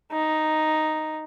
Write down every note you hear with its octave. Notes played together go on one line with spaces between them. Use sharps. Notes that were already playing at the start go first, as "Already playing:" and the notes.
D#4